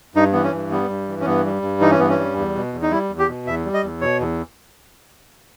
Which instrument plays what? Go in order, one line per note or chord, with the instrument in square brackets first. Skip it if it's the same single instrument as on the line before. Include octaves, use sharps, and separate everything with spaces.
[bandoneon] G2 D#4
E3 B3
C#4
G2
G3 B3
G2
E3
C#4
G2 B3
G3
G2
E3 D#4
C#4
G2 B3
C#4
G3
E2
B2
E2
D#4
G3 E4
E2
G4
B2
E2 E5
G3
D#5
E2
B2 C#5
E2